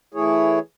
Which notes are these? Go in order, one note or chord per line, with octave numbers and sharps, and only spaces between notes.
E3 A3 E4 G#4 C#5